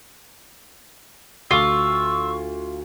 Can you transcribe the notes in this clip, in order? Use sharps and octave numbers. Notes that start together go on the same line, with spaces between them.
D2 F4 C#6 E6